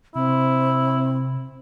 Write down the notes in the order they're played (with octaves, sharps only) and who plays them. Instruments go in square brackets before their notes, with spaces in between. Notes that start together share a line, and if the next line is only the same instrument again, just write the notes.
[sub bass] C3 [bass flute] C4 [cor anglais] E4